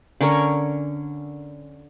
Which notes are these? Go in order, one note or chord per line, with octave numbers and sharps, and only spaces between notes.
D3 C#4 A#4 C#6